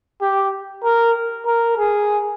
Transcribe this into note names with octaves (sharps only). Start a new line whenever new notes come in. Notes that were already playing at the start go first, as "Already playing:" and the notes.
G4
A#4
A#4
G#4